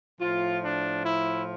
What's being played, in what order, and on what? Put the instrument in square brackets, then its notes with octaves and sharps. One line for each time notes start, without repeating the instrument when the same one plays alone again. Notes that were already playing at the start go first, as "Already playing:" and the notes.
[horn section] A2 F3 F4
D4
E4